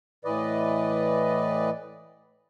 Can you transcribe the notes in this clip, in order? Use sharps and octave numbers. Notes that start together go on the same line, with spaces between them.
A2 E3 B4 D5 D#5